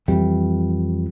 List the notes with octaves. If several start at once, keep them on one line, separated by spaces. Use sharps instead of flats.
F2 E3 G3